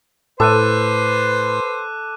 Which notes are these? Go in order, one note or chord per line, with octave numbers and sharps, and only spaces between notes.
A2 A4 B4 C5 D6 F#6 D#7